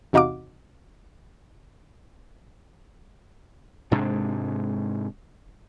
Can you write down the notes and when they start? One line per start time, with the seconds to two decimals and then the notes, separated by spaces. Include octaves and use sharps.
0.13 E2 C3 D#4 F#4 F5 D6
3.91 G#2 C3 G#3 D4